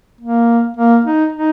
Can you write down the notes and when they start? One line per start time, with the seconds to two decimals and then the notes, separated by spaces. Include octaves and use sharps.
0.21 A#3
0.77 A#3
1.05 D#4
1.33 D#4